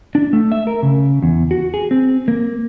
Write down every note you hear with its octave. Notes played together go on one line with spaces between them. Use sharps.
D4
A3
E5
A#4
C#3
E2
F#4
G#4
C4
A#3